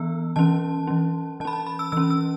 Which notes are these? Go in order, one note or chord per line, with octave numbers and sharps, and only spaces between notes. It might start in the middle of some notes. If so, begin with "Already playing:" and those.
Already playing: E3 B3 E6
E3 C#4 A5
E3 C#4
E3 C#4 A5 B5
A5
B5
E6
E3 C#4 E6
E6